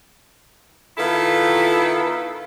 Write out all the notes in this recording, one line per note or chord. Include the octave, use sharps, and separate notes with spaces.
D#3 B3 E4 F4 A4